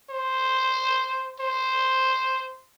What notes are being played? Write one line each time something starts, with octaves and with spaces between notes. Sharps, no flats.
C5
C5